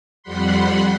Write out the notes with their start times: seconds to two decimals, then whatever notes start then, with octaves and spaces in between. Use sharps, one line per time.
0.23 F2 G3 F#5 B5 C6